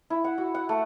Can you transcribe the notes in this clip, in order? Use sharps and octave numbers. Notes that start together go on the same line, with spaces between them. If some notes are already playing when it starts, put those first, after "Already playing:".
E4
F#5
F#4
F#5
A3